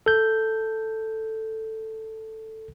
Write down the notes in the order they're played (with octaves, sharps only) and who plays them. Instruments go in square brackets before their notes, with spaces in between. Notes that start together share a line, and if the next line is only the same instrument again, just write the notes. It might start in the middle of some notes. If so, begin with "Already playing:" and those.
[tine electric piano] A4 G6